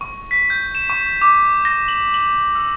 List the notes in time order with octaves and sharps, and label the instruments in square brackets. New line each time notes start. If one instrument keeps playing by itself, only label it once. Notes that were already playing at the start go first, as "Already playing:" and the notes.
[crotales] C#6
B6
G6
E7
C#6
D6
A#6
F#7
F#7
E6